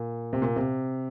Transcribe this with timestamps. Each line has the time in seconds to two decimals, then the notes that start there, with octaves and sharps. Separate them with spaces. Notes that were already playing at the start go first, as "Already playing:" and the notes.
Already playing: A#2
0.33 C3
0.42 A#2
0.56 C3